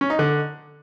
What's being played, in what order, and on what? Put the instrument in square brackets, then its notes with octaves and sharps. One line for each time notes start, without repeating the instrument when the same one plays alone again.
[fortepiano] C#4
D#4
D3